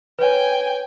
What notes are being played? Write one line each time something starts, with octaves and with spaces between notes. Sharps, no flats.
B4 C#5 G5 G#5